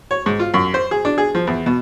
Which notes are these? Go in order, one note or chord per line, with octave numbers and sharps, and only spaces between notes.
C#5
G#2
F4
F#2
C5
G#4
D4
G#4
F3
E2
B2